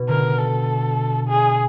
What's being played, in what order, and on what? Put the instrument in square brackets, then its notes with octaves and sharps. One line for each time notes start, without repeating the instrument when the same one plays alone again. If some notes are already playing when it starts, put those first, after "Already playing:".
Already playing: [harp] B2
[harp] D3 [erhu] A#4
[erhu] A4
G#4